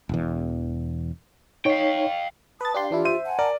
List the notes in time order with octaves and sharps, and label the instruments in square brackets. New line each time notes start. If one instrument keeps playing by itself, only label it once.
[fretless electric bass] E1 E2
[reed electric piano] D#4 C#5 [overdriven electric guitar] F5 G5
[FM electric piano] B4 A6 [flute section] A5 D#6
[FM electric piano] D4 G4 C6 [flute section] F5
[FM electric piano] E3 D4 E4 [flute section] F4 G4
[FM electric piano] C5 [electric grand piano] E5 D#7
[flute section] F#5 G#5 A5
[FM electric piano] A#4 [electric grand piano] D5